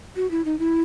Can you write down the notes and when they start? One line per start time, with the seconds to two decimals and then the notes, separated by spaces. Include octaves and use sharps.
0.16 F#4
0.31 E4
0.45 D#4
0.59 E4